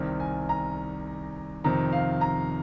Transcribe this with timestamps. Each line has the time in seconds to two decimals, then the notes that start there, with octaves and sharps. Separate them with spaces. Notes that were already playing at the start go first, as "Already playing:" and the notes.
Already playing: C2 C3 D#3
0.20 G#5
0.49 A#5
1.64 F2 C3 D#3 A#5
1.92 F5
2.21 A#5